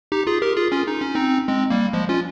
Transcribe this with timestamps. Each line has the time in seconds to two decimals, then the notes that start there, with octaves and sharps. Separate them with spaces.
0.12 D#4 G4
0.27 F4 G#4
0.42 G4 A#4
0.57 F4 G#4
0.72 C#4 F4
0.87 D#4
1.01 C#4
1.15 C4 D#4
1.48 G#3 C4
1.70 G3 A#3
1.93 F3 G#3
2.09 C#4 F4